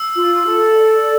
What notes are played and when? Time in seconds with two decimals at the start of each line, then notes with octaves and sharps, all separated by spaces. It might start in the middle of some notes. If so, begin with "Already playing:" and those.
Already playing: E6
0.16 F4
0.45 A4
0.74 D5